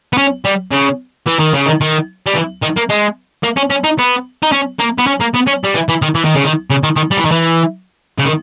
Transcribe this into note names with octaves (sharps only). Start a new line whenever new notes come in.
B3
C#4
G3
C#3
E3
D#3
C#3
D#3
D#3
G3
E3
D#3
A#3
G#3
A#3
C#4
C#4
D#4
B3
D#4
C#4
A#3
B3
C#4
A#3
B3
C#4
G3
E3
E3
D#3
E3
D#3
C#3
D#3
C#3
D#3
D#3
G3
E3
D#3
E3
C#3
D#3